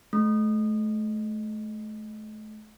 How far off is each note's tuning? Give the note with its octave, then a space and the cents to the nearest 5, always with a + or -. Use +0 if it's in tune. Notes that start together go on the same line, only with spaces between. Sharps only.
A3 -35